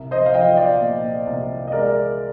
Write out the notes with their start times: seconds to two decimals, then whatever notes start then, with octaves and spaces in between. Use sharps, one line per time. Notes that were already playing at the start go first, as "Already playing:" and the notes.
Already playing: C2
0.11 C5 D#5
0.26 F5
0.34 F3 D#5 G5
0.49 G5
0.57 D5 F5
0.81 A#2
1.27 C2
1.68 D#5
1.72 G#3 A#4 D5